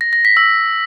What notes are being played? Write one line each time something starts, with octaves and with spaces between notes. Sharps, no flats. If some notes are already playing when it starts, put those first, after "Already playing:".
A#6
A#6
B6
E6